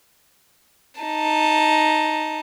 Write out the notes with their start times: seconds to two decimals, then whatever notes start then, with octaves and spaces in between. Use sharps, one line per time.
1.01 D#4 A5